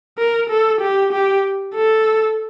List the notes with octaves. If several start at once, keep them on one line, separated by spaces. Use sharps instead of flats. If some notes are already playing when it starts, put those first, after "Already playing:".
A#4
A4
G4
G4
A4